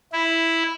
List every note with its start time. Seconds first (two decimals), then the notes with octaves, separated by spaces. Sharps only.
0.13 E4